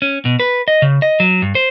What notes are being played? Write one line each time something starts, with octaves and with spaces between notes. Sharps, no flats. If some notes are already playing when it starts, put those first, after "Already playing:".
C#4
B2
B4
D#5
C#3
D#5
F#3
G2
C5